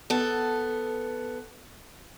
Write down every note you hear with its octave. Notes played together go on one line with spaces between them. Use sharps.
B3 A4